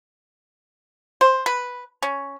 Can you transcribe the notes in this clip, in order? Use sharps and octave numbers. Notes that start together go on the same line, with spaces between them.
C5
B4
C#4